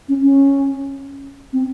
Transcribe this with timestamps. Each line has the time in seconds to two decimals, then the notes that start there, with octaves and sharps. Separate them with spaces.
0.09 C#4
0.23 C#4
1.53 C4